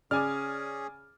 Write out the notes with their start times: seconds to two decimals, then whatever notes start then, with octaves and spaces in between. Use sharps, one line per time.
0.11 C#3 C#4 G#4 D5 G#5 D6 F6